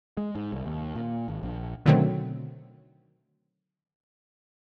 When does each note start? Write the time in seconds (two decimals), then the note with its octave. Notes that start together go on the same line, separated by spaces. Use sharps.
0.17 G#3
0.35 G#2
0.53 C2
0.66 D#2
0.95 A#2
1.28 G#1
1.43 A#1
1.86 B2 D3 D#3 F#3 A3 C4